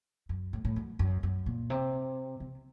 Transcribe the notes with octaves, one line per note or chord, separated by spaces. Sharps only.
F#2
A2
A2
F#2
F#2
F#2
A#2
C3
C3